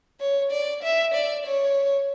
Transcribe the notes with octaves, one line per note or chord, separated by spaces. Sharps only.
C#5
D5
E5
D5
C#5